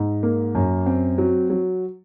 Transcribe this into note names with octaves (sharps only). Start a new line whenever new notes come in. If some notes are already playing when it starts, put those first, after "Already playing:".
Already playing: G#2
A#3
F#2
C4
F#3
F#3